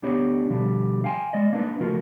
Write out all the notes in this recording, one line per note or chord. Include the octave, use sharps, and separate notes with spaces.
D2 D3 B3 D4 G4 C#5
B2 D3 F3 G3
F5 G5 G#5 C6
G#3 D5 D#5
A#3 D4 D#4 B4
C#3 F3 A3 F4 F#4 A#4